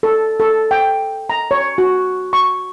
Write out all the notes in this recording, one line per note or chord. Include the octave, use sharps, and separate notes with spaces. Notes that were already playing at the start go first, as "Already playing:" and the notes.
A4
A4
G5
A#5
C#5
F#4
C#6